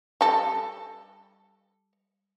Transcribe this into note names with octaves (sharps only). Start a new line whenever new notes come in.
G3 A4